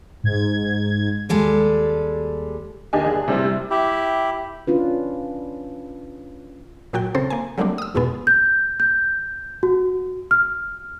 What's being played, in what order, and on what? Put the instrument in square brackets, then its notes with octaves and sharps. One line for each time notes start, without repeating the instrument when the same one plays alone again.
[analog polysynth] G#2 G#6
[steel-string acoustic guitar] D#2 G3 G#3 A4
[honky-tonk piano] D#2 D4 G4 D#5 G#5
G1 D4 G#4
C3 G3 C4 E4
G3
[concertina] E4 G4
[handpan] C#4 D4 F4 B4
[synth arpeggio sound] A#2 F#3 F#4 G5
C#3 C4 A4 C5
A#3 G#5
F#3 G3 A3 A#3 C4 D4
D#6 E6
E2 G#2 B2 G#3 B3
[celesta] G6
G6
F#4
F6